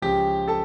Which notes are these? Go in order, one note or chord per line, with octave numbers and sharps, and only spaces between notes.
C#2 C#3 F3 G4 G5
A4 A5